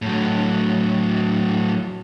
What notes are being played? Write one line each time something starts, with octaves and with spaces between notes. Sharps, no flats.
A2 F#3